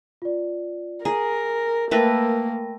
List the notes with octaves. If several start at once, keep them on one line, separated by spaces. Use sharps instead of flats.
F4 D5
G#4 A#4 G#5 A#5
A3 A#3 A#4 B4 G5 A#6